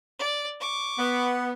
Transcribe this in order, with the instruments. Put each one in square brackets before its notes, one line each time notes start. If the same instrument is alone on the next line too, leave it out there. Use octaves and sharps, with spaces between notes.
[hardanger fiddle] D5
C#6 D6
[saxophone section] B3